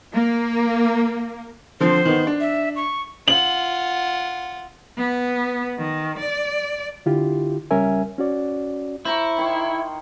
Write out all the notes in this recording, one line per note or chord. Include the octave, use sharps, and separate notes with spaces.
A#3
D3 F3 C4 C5
D#3 B3
D4
E5
C#6
F4 F#5 F#7
B3
D#3
D5
D3 E4 F4 G4
C#2 G3 C#4 A#4 E5 G#5
C#4 F#4 D5
E4 C5 A#5 C#6
D#3 C6 C#6